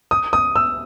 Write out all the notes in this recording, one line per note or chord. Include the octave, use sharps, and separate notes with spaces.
D#6
D#6
E6